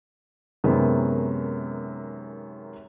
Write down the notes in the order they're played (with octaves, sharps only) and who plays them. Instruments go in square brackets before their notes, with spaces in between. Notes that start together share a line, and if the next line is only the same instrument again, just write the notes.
[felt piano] F#2 C3 D#3 G#3 B3